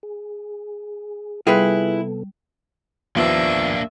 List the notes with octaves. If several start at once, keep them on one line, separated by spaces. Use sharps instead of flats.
G#4
C3 G3 B3 E4 F4 G#4 A4 B4
D#2 F3 A#3 B3 D4 E5